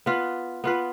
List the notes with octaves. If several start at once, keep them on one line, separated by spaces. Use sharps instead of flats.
B3 F4 B4
B3 F4 B4